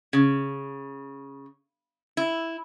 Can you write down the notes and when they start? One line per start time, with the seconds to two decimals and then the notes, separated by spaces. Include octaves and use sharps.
0.13 C#3
2.17 E4